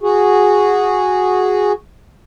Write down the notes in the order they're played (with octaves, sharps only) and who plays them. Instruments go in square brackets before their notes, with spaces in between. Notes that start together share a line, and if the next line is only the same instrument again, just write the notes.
[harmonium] F#4 G#4